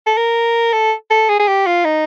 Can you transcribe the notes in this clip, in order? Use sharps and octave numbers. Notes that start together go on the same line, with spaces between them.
A4
A#4
A4
A4
G#4
G#4
G4
F4
D#4